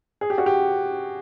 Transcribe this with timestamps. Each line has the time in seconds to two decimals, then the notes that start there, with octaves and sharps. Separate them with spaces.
0.21 G#4
0.30 G4
0.38 F#4
0.46 G4